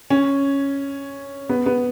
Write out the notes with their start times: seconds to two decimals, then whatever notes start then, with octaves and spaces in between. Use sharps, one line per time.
0.10 C#4
1.49 B3
1.66 B3